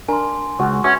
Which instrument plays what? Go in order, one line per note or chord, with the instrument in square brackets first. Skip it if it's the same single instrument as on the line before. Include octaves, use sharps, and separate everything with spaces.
[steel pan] D4 A#4 [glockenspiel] G#5 C6
[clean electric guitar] C#2 [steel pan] F#4 [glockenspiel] C#6
[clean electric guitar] C#4 [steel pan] F#4 B4 E5